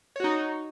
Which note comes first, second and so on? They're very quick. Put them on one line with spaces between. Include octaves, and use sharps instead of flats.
C#5 F#4 D#4